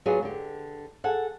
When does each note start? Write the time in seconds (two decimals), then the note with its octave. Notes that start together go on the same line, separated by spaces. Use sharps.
0.06 F#3 B3 F4 G#4 D5
0.22 D3 G4
1.04 G#4 A4 F#5